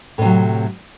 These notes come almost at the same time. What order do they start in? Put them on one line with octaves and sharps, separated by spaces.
A2 C3 F#3